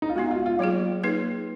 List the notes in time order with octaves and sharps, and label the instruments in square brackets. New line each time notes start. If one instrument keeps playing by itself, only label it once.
[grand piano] D#4
F4
[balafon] G#3 B3 D#4 [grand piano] F#4
[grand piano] F4
F4
[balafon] F#3 A#3 F4 G#4 [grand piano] C#5
[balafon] A#3 D#4 G#4 B4